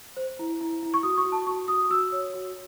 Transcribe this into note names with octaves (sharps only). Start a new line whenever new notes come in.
C5
E4
E4
E4
C#6
F#4 D#6
C#6
F#4
A5
F#4 C#6
F#4 D#6
F#4 E6
C#5
F#4